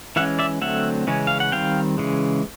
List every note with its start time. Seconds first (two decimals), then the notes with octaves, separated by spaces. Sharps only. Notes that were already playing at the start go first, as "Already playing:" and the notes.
0.16 E3 G#3 C#4 E5 F#5
0.39 D5 E5
0.61 D3 F#3 A3 C4 E5 F#5
1.07 C#3 E3 G#3 C#4
1.27 F5
1.40 F#5
1.52 D#3 G3 C4 F5 G5
1.98 C#3 E3 G#3